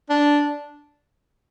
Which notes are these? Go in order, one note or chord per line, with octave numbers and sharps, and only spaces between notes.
D4